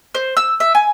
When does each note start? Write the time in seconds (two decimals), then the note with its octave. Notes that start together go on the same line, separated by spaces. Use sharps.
0.15 C5
0.37 E6
0.60 E5
0.75 G#5